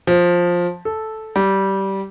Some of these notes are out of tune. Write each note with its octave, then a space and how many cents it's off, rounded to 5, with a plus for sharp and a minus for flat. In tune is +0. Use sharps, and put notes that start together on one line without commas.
F3 +10
A4 -5
G3 -15